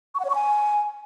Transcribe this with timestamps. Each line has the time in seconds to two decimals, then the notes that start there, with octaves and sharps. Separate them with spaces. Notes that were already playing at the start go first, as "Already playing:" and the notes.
0.15 C#6
0.20 F#5
0.25 C#5
0.30 C#6
0.35 G#5